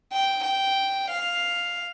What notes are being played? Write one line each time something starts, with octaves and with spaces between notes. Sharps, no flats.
G5
G5
F5